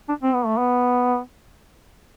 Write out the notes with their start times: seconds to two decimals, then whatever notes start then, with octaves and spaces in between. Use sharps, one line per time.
0.09 D4
0.23 C4
0.34 B3
0.46 A3
0.58 B3